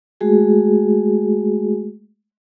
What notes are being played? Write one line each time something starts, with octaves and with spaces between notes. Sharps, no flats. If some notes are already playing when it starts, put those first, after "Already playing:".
G#3 A3 F#4 G#4